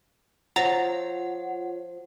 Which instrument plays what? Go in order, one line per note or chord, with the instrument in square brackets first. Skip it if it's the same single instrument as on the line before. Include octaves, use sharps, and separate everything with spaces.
[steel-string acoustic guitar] F3 [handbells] F4 C#5 [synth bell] F#5 [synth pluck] A#5 A6